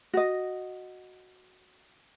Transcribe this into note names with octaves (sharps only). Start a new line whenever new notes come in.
F#4 D#5